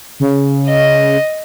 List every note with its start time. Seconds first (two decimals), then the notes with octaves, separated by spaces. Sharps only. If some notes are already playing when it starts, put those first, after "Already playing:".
0.20 C#3
0.69 D#5